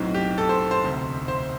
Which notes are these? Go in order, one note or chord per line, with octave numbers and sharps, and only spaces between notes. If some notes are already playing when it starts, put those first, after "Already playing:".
Already playing: B1 A2 F#3 C4
G4
A4
C5
C5
E1 D2 C3
C5